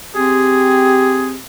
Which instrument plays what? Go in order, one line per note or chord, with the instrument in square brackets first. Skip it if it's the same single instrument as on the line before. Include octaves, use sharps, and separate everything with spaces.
[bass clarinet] C4 [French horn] G4 [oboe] G#4